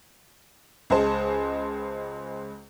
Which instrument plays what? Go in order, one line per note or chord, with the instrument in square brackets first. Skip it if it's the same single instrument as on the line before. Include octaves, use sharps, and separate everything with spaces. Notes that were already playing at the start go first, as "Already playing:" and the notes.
[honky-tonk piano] C#2 G#3 G#4 C5 A5